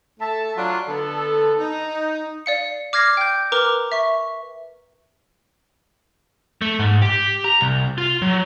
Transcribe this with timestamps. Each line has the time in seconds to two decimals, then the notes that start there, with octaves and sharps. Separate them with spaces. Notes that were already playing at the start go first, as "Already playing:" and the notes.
0.20 A3 E5 A5
0.56 F#3 D4 F4
0.88 D3 B3 A4
1.58 D#4
2.46 D5 F5 C#7
2.93 D6 F6 G#6 A#6 C7
3.17 G5 G6
3.52 A#4 B4 A#5 D6 F6
3.92 E5 C#6
6.62 A3
6.79 G#2
7.02 G4
7.44 A#5
7.61 C2
7.98 F4
8.22 F#3